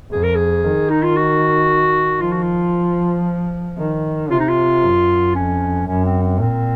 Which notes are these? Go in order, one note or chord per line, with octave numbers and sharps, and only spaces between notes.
F2 G#4
A#4
G#4
D#3
D#4
F4
F#4
F3 F4
F#4
F4
D#3
C3 F4
D#4
F4
F#2
F2 C#4
F#2 C#4
C4
C4
A#2 C4